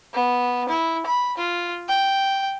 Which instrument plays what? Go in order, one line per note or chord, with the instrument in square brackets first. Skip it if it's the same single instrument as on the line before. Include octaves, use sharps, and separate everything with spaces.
[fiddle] B3
E4
B5
F4
G5